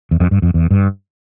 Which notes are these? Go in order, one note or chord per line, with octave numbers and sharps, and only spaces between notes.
E2
F2
G2
F2
E2
G2